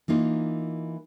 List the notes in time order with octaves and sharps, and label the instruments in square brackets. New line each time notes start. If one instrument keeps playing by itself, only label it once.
[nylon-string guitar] E3 A#3 D#4 F4